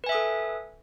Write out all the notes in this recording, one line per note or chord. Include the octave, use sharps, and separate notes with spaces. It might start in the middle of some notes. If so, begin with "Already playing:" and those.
A4 B4 E5 G#5 D#6